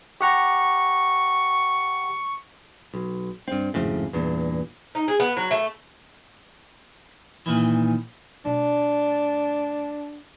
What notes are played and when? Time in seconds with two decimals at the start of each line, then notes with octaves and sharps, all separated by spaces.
0.21 G4 F#5 A#5 C#6
2.94 B1
3.48 G2 C4
3.74 G#1 F2 A2 C#3
4.13 E2 G2 A#2
4.95 D#4
5.08 G#4
5.20 B3
5.37 F#3
5.51 A3
7.46 A#2 D#3 E3
8.45 B2 A3 D4